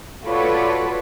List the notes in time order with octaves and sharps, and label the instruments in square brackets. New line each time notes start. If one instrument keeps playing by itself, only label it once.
[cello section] F4 F#4 A4 B4 C#5 D5